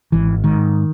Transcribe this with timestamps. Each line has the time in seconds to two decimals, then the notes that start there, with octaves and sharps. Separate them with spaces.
0.12 G#1 E3
0.44 G#2 D#3